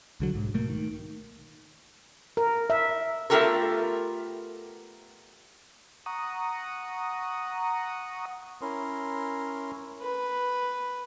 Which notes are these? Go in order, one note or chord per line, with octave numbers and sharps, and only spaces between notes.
C2 D3 F#3
B1 G#2
C2 B2 A3 A#3
D#3
A#4
E5
A3 B3 F4 G4 A4 A#4
F#5 A#5 C#6 D#6
C#4 E4 A#4 C6
B4